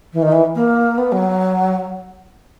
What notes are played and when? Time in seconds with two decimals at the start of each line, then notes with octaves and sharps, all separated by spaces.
0.13 E3
0.22 D#3
0.32 E3
0.55 A#3
0.98 B3
1.12 F#3